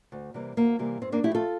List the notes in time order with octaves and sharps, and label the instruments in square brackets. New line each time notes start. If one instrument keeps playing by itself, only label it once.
[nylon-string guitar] D2
C3 E3 G3 A#3
D2 A#3
C3 E3 G3 A#3
G2 C4
A#3 D4
F3 A3 E4 G4
F4 A4